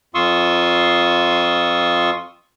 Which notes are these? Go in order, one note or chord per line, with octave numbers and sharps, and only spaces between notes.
F2 F4 C6 C#6 D#6 E6